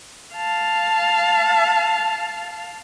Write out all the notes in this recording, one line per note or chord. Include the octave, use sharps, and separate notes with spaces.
F5 A5